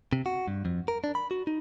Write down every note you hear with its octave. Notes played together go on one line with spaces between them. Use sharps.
C3
F#4
G2
F2
A#4
D4
B5
F#4
D#4